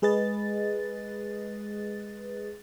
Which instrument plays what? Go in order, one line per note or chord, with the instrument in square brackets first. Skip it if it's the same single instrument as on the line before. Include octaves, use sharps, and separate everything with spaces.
[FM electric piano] G#3 G#4 B4 D#5 A6